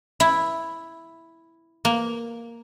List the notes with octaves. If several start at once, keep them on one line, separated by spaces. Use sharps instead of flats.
E4
A#3